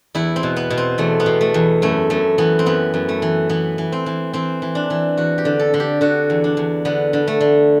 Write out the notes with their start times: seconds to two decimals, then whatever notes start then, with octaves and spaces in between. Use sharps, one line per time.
0.15 E2 E4
0.36 C4
0.43 B2
0.56 B3
0.70 B2
0.77 C4
0.98 E2 A3
1.20 B3
1.26 B2
1.41 A3
1.54 E2
1.82 F#2 A3
2.10 F#2 A3
2.38 E3 B3
2.59 C4
2.66 F#2 B3
2.94 F#2
3.09 A3
3.22 E3
3.49 E3 B3
3.78 E3
3.92 C4
4.06 E3
4.33 E3 C4
4.62 E3
4.75 D4
4.90 E3
5.17 E2 F#4
5.38 G4
5.45 D3
5.59 A4
5.74 D3
5.80 G4
6.01 D3 F#4
6.30 E2
6.44 D4
6.57 E2
6.85 D3 B3
7.13 D3
7.28 A3
7.41 D3